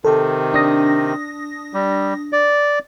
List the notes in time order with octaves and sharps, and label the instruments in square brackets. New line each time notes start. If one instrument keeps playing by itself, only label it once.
[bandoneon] C3 D#3 [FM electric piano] A4
[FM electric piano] D4 D#6 A#6
[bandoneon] G3
D5